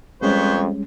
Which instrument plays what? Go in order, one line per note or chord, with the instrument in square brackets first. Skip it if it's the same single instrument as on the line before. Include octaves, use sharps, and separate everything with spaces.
[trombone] F2 [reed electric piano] G3 G#3 C#4 [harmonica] B3 C5 C#5